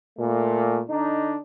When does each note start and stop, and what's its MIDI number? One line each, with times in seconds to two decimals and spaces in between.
0.18 0.80 46
0.18 0.80 57
0.88 1.36 50
0.88 1.36 62
0.88 1.36 63